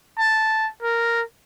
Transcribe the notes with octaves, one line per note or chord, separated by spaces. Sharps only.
A5
A#4